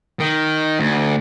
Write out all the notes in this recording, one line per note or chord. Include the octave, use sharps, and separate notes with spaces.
D#3
D2